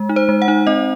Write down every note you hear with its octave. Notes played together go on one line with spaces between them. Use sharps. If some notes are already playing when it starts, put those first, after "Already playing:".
Already playing: G#3
D#4
C5
G#3
F#5
D#4
C4 D#5